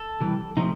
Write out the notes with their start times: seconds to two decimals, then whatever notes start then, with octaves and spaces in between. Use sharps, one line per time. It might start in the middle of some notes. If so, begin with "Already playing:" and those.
Already playing: A4
0.20 C3 E3 G3
0.57 C3 F3 A3 D#4